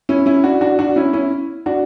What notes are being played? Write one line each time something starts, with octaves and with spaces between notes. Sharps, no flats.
C#4 E4
C#4 E4
D4 F#4
D4 F#4
D4 F#4
C#4 E4
C#4 E4
D4 F#4